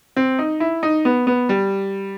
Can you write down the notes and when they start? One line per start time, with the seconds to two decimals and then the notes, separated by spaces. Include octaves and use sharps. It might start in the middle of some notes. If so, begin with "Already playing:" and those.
0.16 C4
0.39 D#4
0.60 E4
0.83 D#4
1.05 B3
1.27 B3
1.49 G3